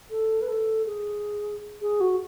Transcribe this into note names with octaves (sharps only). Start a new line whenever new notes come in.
A4
B4
A4
G#4
G#4
F#4